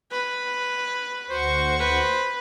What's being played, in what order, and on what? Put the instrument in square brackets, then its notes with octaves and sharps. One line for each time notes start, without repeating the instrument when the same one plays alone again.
[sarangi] B4
[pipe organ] D2 F#4 C#6 [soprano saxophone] C5
[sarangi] B4 [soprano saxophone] C5